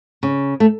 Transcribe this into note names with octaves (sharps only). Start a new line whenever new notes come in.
C#3
A3